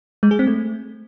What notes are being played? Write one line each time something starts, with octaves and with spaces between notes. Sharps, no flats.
G#3
G#4
C4
A3